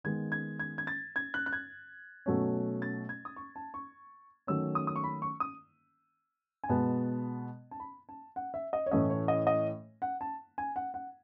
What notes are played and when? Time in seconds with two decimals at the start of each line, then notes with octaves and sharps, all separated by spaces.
0.04 D#3 G#3 B3 G#6
0.32 G#6
0.60 G#6
0.78 G#6
0.87 A6
1.16 G#6
1.34 F#6
1.46 F#6
1.53 G#6
2.26 B2 F#3 A3 C#4
2.82 A6
3.09 G#6
3.25 D#6
3.36 C#6
3.56 A5
3.74 C#6
4.47 D#3 F#3 A3 C#4 E6
4.75 D#6
4.87 D#6
4.96 C#6
5.04 B5
5.22 C#6
5.40 D#6
6.64 G#5
6.69 B2 G#3 B3 A5
7.71 A5
7.80 B5
8.09 A5
8.36 F#5
8.54 E5
8.73 D#5
8.86 C#5
8.91 A2 E3 A3 C#4 D#5
9.10 C#5
9.28 D#5
9.47 D#5
10.02 F#5
10.21 A5
10.58 G#5
10.76 F#5
10.94 F#5